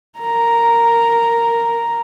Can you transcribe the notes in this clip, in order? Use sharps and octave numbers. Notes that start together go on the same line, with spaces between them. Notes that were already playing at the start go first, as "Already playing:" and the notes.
A#4 A#5